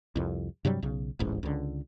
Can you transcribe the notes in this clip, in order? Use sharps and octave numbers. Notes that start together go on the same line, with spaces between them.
C2 F2
G2 C3 F#3 G3
B1 C#3
D1 A1 G#2
C#2 D3